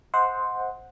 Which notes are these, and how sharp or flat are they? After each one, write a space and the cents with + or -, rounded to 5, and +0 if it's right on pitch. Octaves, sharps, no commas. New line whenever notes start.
C5 +0 D#5 +35 F#5 -10